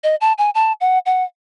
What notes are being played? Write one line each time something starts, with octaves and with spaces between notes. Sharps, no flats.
D#5
A5
G#5
A5
F#5
F#5